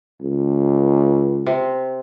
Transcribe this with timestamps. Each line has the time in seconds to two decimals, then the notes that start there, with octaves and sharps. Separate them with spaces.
0.21 C#2
1.46 C3